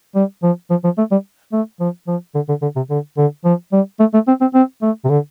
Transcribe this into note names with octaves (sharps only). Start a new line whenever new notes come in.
G3
F3
F3
F3
A3
G3
A3
F3
F3
D3
D3
D3
C3
D3
D3
F3
G3
A3
A3
C4
C4
C4
A3
C3
D3